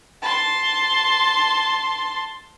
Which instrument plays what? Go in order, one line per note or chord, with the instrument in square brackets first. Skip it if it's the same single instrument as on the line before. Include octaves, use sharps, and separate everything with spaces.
[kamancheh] A5 C6